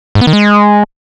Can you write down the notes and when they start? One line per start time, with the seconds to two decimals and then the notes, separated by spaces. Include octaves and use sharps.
0.15 G#2
0.21 B3
0.27 D#3
0.33 G#3